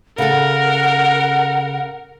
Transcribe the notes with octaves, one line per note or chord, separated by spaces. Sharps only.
C#3 A4 A#4 F#5